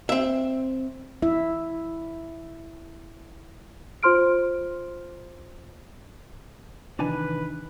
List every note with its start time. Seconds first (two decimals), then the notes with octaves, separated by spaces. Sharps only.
0.09 C4 E5
1.22 E4 E5
4.03 F4 C5 C6 F6 D7
6.99 C3 D#3 E3 D4 D#4 B4 G#5